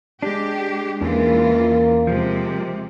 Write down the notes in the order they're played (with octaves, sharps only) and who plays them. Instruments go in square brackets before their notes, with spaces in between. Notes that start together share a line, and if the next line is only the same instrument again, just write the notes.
[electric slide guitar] G#3 D4 [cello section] G4
[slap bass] E2 C#4 [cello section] E3 F4 [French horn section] A#3
[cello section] C3 G#3 [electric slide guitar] F3